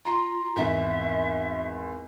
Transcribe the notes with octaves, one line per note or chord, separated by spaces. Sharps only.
F4 A#5 C6
G#1 E2 E5